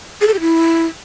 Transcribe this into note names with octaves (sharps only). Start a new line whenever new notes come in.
G#4
A4
G4
E4